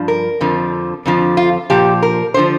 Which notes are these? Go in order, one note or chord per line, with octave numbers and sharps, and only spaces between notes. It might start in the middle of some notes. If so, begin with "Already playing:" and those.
Already playing: G2 F3
A#4
F2 D3 F3
F2 D3 F3
F4
A#2 F3 G4
A#4
D3 F3 C5